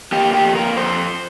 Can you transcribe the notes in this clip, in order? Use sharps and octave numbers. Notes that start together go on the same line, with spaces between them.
A#3 G4
G4
F2
A#4
F2 C5